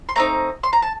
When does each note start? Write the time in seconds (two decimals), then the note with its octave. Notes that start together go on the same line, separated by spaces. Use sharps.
0.09 C6
0.16 A3 C4 D#4 A#5
0.63 C6
0.73 A#5
0.82 A5